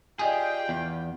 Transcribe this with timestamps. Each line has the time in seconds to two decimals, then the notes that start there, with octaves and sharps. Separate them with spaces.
0.19 F4 G4 G#4 D5 D#5 G5 G#5
0.69 E2 E5